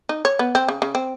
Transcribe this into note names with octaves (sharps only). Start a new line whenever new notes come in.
D#4
C#5
B3
C4
C#3
C#3
C4